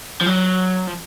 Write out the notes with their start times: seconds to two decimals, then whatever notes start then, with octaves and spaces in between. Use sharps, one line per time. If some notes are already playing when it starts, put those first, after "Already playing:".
0.21 F3
0.26 F#3
0.87 F3